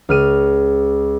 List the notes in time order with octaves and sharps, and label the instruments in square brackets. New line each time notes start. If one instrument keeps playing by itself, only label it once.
[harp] C#2 F6 D#7